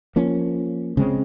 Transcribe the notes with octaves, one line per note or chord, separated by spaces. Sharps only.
F3 A#3 C#4
C#3 G#3 C4